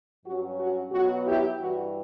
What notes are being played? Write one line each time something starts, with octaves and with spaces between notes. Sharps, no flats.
G2 F#3 C#4 F#4
F#4
B2 F#3 B3 F#4
E4 G4
G2 E3 G3 F#4